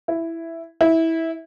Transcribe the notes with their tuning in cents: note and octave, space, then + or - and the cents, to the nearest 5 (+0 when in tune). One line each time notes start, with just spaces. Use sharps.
E4 +5
E4 -15